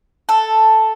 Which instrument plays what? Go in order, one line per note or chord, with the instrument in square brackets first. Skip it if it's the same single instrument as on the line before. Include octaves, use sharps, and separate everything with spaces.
[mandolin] A4